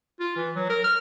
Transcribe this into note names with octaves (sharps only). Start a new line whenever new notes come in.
F4
E3
F#3
A#4
F6